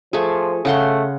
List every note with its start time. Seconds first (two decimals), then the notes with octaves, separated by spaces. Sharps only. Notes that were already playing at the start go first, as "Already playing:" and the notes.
0.13 F3 A3 G#4
0.65 C#3 A3 F#5 C6